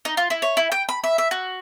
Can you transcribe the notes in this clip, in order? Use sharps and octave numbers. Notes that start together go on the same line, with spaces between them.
D#4
F4
E4
C#5
E4
G5
B5
E5
E5
F#4